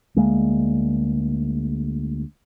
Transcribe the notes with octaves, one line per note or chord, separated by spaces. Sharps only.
D2 G#3 A#3